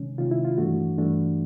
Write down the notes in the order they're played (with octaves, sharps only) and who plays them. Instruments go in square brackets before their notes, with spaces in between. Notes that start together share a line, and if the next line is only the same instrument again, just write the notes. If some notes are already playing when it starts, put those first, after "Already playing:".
Already playing: [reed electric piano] C3 D#3 G#3 C#4
C3 D#3 G#3 C#4 F4
E4
F4
G2 E3 A3 D4 F#4
G2 E3 A3 D4